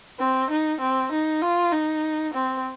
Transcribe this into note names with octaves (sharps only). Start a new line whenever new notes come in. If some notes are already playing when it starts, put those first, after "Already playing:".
C4
D#4
C4
D#4
F4
D#4
C4